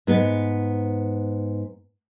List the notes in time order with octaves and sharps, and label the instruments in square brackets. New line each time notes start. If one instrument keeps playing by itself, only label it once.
[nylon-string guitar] G#2 B3 B4